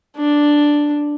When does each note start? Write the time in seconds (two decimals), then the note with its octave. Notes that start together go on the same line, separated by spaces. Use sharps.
0.17 D4